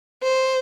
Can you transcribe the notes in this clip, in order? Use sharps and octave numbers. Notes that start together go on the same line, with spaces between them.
C5